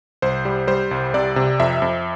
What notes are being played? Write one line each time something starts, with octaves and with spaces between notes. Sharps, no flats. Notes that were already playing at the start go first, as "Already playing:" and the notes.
C2 C5
G3
G3 C5
C2
C3 D5
C3
F2 E5
F2